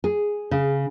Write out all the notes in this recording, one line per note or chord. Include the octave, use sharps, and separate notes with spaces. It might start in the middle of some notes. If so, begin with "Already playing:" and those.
G#4
C#3